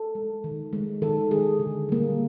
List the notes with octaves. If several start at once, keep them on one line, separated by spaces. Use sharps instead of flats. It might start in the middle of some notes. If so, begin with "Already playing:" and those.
Already playing: A4
G#3
D#3
G#3
D#3 A4
G#3 G#4
D3
G3 A#3